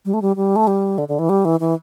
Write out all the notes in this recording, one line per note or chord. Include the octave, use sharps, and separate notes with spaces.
G3
A3
G3
G3
A3
G3
D3
D3
E3
G3
E3
E3